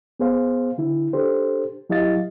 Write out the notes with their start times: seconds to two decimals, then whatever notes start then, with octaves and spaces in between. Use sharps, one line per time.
0.20 B3 G#4 C5 F5
0.78 D3 E4
1.13 D4 G4 A4 C5
1.90 F#3 E4 G4 D#5 F5 A6